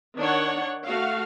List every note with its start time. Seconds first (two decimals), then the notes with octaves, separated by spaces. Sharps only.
0.18 D#3 D4 C#5 F#5
0.86 A3 F#4 F5